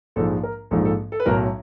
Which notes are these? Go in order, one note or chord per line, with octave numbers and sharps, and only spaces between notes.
A#1 G#2 F3 G#3 A4
A#4
A#1 G#2 F3 G#3 A4
A4
A4
B4
B1 A2 F#3 A#4